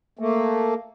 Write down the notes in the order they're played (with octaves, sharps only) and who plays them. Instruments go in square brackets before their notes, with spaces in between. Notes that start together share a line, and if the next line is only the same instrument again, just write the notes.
[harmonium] A3 A#3